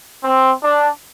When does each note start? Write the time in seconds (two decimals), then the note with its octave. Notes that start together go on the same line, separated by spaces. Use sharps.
0.24 C4
0.62 D4